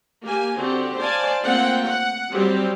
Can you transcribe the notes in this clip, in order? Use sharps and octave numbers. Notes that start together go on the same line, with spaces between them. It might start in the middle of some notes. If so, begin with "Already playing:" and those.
A#3 G4 G#5
D3 C4 F#4 G4
C5 D5 F5 G#5 A5
A3 A#3 C4 F4 F#5 G5
F#5
F#3 G3 C4 G4